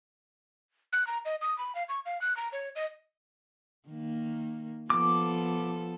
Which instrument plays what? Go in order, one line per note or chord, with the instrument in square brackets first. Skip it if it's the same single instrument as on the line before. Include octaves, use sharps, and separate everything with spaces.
[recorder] F#6
A#5
D#5
D#6
B5
F5
C#6
F5
F#6
A#5
C#5
D#5
[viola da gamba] D#3 A#3
[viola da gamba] F3 B3 A4 [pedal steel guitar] D6